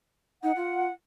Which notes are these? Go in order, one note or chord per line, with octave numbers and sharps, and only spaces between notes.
D#4 F#5
F4